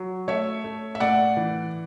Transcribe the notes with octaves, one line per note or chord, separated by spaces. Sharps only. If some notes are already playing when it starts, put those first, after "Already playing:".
Already playing: F#3
A3 C#5 E5
A3
E5
A2 D5 F#5
E3